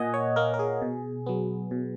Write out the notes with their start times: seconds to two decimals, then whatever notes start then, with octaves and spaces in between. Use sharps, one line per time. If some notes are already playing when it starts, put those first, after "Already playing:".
Already playing: A#2 A#3 D#5 F#5 G#5
0.14 C#5
0.36 A#3 A#4
0.54 A#4
0.59 G#4
0.82 B2
1.26 F#3 B3
1.71 B2